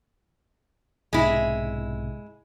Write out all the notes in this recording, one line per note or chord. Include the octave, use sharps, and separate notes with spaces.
B1 G#2 C3 G#3 E4